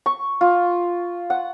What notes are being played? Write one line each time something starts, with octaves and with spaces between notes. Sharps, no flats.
C#6
F4
F#5